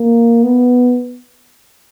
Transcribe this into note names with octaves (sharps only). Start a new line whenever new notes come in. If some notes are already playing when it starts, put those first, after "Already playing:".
Already playing: A#3
B3